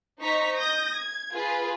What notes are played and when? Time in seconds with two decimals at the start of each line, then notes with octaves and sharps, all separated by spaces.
0.22 D#4 C5 A#5 C#6 B6
0.60 D#6 G6 A#6
0.95 G#6
1.35 F4 G#4 B4